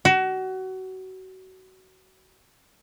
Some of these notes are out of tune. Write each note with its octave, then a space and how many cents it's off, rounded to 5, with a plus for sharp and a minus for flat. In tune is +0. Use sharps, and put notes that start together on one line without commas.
F#4 +25